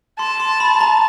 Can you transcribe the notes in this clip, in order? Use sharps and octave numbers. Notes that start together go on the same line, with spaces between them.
A5 C6
C6
B5
A#5